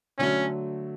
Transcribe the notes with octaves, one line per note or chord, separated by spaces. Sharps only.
D3 F#3 A3 C#4